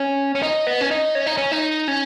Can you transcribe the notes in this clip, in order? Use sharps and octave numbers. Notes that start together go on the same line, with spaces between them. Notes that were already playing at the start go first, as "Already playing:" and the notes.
Already playing: C#4
C#4
D#4
B3
C#4
D#4
C#4
D#4
C#4
D#4
C#4